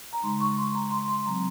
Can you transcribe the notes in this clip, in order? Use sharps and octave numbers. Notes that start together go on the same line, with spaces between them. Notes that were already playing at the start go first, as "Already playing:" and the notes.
A#5
C#3 G#3 D#4 C6
C#6
C6
A#5
C6
C6
C3 F#3 C4 A#5